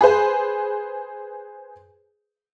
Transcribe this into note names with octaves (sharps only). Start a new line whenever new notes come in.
G#4 B4 C5